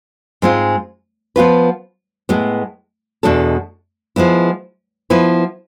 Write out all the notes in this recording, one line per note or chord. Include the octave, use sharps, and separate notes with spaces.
G#2 G#3 C4 F4
F3 B3 F4 B4
A2 G#3 B3
E2 B2 G#3 D4 A4
F3 G#3 B3 E4
F3 B3 E4 B4